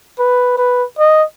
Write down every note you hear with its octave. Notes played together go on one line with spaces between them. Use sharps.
B4
B4
D#5